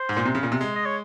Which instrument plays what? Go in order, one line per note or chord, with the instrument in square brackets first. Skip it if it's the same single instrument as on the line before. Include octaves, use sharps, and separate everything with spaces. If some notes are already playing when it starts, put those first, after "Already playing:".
Already playing: [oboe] C5
[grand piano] G#2
A#2
C3
C#3
A#2
C3
G#3
[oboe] D#5
C#5